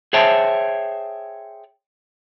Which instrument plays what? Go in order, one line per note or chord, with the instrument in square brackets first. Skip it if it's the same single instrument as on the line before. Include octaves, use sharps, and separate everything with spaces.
[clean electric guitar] G#4 C5 C#5 E5 G5 A5